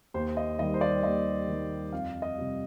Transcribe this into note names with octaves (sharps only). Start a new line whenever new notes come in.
D#2 C5
D#5
D#3 G3 D#5
C5
D5
D#2 D#5
D#3 G3
F2 F5
D#5
C3 G3